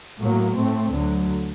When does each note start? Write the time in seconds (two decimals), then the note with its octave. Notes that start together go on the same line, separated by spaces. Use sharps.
0.20 A2 F#3 A#3
0.57 A2 A3 C4
0.92 D2 D3 F#3